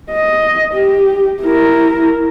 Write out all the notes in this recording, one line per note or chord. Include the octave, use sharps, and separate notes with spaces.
D#5
G4
E4 A#4